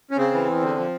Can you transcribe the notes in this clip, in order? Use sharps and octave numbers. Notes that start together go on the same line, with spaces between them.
C#4
C#3 C4
E3
E2
D3
F3